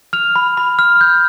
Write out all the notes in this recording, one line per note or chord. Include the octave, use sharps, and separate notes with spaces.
F6 F7
B5
B5
F6
G6